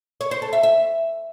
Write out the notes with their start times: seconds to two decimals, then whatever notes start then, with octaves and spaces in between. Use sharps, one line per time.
0.21 C#5
0.31 C5
0.42 A4
0.53 E5
0.63 E5